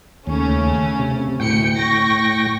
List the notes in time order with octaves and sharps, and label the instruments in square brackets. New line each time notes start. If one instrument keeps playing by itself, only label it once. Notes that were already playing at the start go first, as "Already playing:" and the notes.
[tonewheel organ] D#2 [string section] C#3 A3 C#4
[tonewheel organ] C3
[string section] D2 C#7 [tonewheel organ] A2 G5
[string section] C#6 A#6